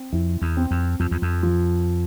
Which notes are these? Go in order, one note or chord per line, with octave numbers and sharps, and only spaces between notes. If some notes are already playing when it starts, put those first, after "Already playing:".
Already playing: C4
F2 E4
E2
C4
F2
F2 F3
E2
F2
F3